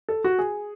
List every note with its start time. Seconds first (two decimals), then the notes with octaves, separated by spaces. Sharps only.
0.09 A4
0.24 F#4
0.39 G#4